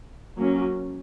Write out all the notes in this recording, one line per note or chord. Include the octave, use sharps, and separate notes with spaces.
F#3 A#3 C#4